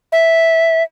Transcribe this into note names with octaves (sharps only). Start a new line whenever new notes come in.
E5